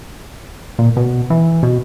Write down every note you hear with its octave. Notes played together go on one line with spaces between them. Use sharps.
A#2
B2
E3
B2